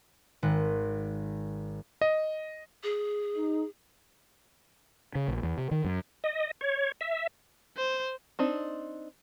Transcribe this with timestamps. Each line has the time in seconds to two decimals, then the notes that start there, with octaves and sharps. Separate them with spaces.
0.43 G#1 F#6
2.01 D#5
2.83 G#4
3.35 D#4
5.15 C#3
5.28 A#1
5.43 E2
5.58 C3
5.71 D#3
5.84 F#2
6.24 D#5
6.61 C#5
7.01 E5
7.78 C5
8.39 C4 D4 D#4